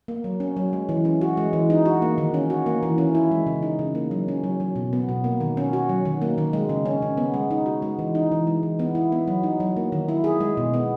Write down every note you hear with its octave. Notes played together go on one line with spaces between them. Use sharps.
A#3
F#3
C#4
F#3
G#3
E3
C#4
F#4
G#3
E3
D#4
F#4
A#3
D#3
C#4
F#4
A#3
E3
C#4
E4
G#3
C#3
D#4
C#3
A#3
F#3
C#4
F#3
F#3
B2
B3
B2
A#3
D#3
C#4
F#4
F#3
D#3
A#3
D#3
G#3
C#3
C#4
C#3
B3
G#3
D#4
F#4
G#3
E3
D#4
E3
G#3
E3
B3
E4
B3
F#3
D#4
F#3
A#3
D#3
E4
G#4
G#3
B2
B3